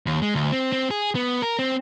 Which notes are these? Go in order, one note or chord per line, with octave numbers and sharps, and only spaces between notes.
D#2
G#3
D2
C4
C4
G#4
B3
A#4
C4